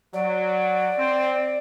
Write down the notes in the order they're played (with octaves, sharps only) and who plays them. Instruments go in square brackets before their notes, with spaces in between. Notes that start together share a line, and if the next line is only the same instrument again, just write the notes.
[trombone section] F#3 [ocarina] D5
[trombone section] C4